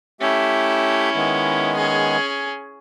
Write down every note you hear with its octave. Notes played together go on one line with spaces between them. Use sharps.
A3 C#4 E4 G4 E5
D#3 G#3 B3
C#4 G#4